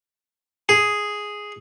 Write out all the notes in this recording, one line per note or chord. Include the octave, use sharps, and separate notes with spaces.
G#4